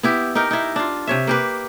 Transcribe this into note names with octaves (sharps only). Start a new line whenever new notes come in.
B3 E4 G4
D#4 G4 A#4
D#4 E4
D4 F4
C3 C#5 E5
A#3 G4 B4